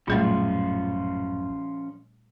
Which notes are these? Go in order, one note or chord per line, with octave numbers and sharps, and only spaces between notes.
A1 F#2 A#2 F3 G3 A3 C#4 F4